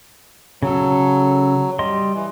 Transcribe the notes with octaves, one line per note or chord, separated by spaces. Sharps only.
C#3 F#3 A4
G3 D#5 C6
E3